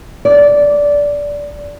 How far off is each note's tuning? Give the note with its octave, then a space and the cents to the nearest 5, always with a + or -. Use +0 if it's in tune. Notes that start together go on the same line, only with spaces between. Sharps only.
D5 -15